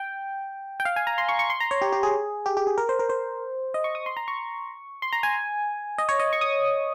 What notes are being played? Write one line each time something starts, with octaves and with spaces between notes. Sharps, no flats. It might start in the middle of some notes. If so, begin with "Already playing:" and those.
Already playing: G5
G5
F5
G#5
A#5
C6
C#6
C#6
C6
A#5
C#5
G4
G4
G#4
G4
G4
G#4
A#4
C5
A#4
C5
D#5
C#6
D#6
C6
A#5
C#6
C6
A#5
G#5
D#5
C#5
D#5
C#6
D#6